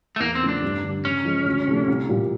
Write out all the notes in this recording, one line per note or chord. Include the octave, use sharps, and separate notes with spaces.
A3
E2 A#3
C4
C#3 F3 A3 C#4
D4
G2
D3 G3
C#3 C#4
F3 G#3
D2
C3 F3 A3
C2
A#2 G3